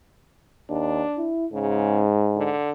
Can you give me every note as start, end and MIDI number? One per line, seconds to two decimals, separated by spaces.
0.70 1.03 39
0.70 1.32 62
1.18 1.46 64
1.53 2.52 44
1.53 2.04 49
2.36 2.72 50